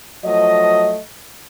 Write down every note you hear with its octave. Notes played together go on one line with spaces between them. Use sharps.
F3 F#3 A3 D#5